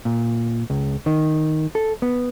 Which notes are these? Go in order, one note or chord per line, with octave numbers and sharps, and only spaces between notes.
A#2
C#2
D#3
A4
B3